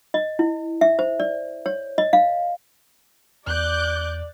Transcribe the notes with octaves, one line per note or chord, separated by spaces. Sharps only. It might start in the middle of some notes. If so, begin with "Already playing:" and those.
D#5
E4
E5
C5
D5
C#5
D#5
F5
E2 D5 D6 F#6 G6